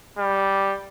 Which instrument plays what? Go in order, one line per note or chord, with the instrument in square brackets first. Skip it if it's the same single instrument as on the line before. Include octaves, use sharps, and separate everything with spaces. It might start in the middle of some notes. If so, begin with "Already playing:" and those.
[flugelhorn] G3